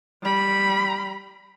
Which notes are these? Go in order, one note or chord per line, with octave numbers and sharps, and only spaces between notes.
G3 B5